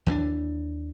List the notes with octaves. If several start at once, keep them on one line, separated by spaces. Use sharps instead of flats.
D#2 E3 B3 D4